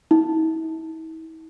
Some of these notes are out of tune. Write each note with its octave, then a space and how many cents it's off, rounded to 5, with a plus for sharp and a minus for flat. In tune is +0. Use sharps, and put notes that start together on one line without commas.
E4 -45